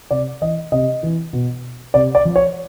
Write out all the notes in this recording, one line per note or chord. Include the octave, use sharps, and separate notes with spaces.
C3 D5
E3 D#5
C3 D#5
E3
B2
C3 D5
D5
F3
C#5